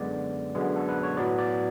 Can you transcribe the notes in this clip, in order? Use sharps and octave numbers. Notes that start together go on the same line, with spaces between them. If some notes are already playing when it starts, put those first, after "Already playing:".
Already playing: F#2 D3 G#3 B3 D5
F#2 D3 G#3 B3
A4
B4
C#5
A2 F#3 B3 D5
D5